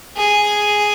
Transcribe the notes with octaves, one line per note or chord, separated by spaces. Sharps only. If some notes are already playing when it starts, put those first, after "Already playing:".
G#4